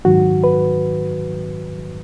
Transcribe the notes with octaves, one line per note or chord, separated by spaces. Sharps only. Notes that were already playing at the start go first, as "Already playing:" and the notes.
G#2 D#3 F#3 F#4
B4